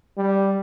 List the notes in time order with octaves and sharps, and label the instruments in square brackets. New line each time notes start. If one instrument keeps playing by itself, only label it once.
[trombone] G3